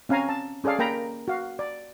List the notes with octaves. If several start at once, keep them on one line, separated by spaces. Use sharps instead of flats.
C4 C#4 F5 G#5 A#5
A5
C#4 G#4 A4 D5 F5
A#3 A#4 G5 A#5 B5
F#4 F5
D5